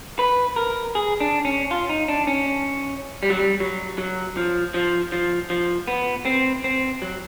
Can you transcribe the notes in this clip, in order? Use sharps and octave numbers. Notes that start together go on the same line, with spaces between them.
B4
A#4
G#4
D4
C#4
F4
D#4
D4
C#4
G3
F#3
G3
F#3
F#3
F3
F3
F3
F3
B3
C4
C4
F#3